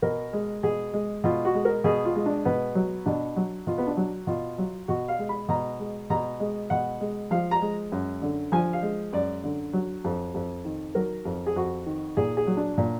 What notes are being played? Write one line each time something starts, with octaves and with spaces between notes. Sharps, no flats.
B2 A#4
G#3
B2 G#4
G#3
B2 F4
F#4
G#3
A#4
B2 G#4
F4
G#3
D4
B2 B3
F#3
B2 D4
F#3
B2 F4
B3
D4
F#3
B2 F4
F#3
B2 F#4
F5
G#3
B5
B2 A#5
G#3
B2 A#5
G#3
B2 F#5
G#3
F3 F5
A#5
G#3
F#2
D3
F3 G#5
F5
G#3
F#2 D5
D3
F#3
F2
F2
D#3
F#3 A#4
F2
G#4
F2 F#4
D#3
A#2 G#4
G#4
F#3
D4
A#2